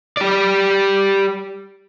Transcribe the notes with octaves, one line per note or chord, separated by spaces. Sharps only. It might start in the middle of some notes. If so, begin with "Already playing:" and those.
G4 D5